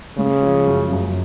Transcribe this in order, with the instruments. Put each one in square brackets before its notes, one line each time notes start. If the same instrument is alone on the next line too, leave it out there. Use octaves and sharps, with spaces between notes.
[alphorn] C#3 [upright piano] G#3
[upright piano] F3
F#2
F#2